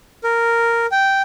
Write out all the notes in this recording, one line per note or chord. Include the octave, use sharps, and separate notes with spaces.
A#4
G5